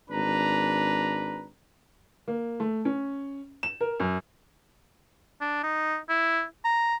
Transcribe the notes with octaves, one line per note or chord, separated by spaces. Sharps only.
G#1 D4 B4 A#5
A#3
A3
C#4
E7
A#4
F#2
D4
D#4
E4
A#5